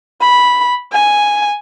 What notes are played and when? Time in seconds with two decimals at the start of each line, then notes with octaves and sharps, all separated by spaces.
0.21 B5
0.92 G#5